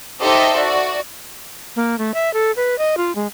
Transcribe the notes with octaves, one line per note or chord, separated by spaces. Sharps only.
D#4 G4 A4 C5 D#5 E5
F#4 D5
A#3
A3
E5
A4
B4
D#5
F4
G#3